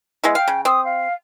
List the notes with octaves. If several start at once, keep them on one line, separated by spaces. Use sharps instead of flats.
G#3 B3 E4
F5 G5
C#3
C4 D#6
F5